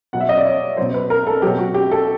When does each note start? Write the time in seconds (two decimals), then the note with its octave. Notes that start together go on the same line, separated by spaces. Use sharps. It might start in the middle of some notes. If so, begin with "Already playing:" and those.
0.13 B2 F#3 F#5
0.20 E5
0.29 D#5
0.37 D5
0.45 C#5
0.77 B2 F#3 C5
0.94 B4
1.10 A#4
1.27 A4
1.42 B2 F#3 G4
1.59 F#4
1.74 G4
1.91 A4